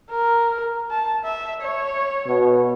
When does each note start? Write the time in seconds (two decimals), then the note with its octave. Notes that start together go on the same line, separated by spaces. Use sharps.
0.10 A#4
0.91 A5
1.24 E5
1.62 C#5
2.27 B2